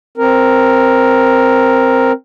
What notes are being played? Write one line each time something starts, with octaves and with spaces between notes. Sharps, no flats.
C4 A#4